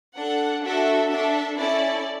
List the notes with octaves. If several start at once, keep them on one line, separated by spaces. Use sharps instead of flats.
D4 A4 F#5
D4 F#4 A4 E5
D4 A4 E5
C#4 E4 A4 D5